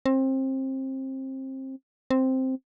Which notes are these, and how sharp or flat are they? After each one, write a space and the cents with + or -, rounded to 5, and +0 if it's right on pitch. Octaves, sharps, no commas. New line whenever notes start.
C4 +25
C4 +0